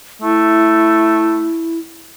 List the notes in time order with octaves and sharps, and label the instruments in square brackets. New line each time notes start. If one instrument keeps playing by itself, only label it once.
[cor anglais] A3 [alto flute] E4